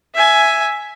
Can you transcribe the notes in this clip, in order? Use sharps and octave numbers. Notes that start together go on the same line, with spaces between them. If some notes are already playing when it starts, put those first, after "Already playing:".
E5 G#5